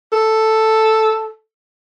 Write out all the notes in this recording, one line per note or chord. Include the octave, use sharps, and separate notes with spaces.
A4